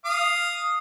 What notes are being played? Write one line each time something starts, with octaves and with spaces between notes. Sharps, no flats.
F5 D#6